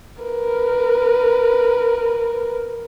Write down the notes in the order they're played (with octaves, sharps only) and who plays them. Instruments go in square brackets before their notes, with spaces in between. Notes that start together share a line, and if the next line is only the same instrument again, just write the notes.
[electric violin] A#4 B4